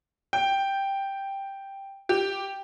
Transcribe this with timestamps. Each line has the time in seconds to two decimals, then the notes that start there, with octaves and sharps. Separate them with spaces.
0.33 G5
2.09 G4